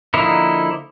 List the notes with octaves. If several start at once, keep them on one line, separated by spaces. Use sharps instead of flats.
D3 F3 A#3 D#4 E4